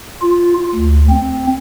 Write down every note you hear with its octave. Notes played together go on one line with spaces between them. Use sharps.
F4
D2
C4